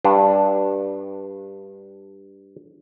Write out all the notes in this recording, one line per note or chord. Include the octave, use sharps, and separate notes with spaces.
G2 D4